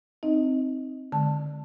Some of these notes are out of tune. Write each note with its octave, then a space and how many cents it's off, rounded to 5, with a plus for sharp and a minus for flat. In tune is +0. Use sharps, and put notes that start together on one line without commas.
C4 +0 D#4 +0 D#5 +15
D3 +5 G#3 +20 A5 +0